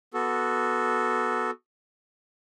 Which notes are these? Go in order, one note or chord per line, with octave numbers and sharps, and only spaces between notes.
B3 F#4 A4